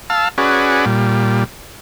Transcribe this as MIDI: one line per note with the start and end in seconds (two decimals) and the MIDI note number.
0.10 0.29 77
0.10 0.29 81
0.10 0.29 88
0.38 0.85 61
0.38 0.85 66
0.38 0.85 68
0.38 0.85 71
0.38 0.85 74
0.86 1.44 46
0.86 1.44 55